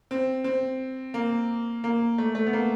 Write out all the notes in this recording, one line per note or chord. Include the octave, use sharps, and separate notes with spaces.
C4
C4
A#3
A#3
A3
A3
B3
A#3